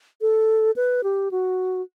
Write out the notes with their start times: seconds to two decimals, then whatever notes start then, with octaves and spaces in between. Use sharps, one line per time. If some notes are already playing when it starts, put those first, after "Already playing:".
0.21 A4
0.76 B4
1.04 G4
1.31 F#4